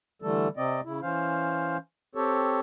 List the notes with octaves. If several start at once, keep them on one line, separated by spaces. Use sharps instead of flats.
D3 E3 G3 A3 A4
C3 C4 D5 D#5
C#3 E4
E3 C#4 C5 F5
C4 G4 A4 C#5